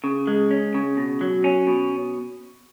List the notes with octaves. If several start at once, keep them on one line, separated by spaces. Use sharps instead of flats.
C#3
G#3
C#4
C#3
B2
F#3
C#4
B2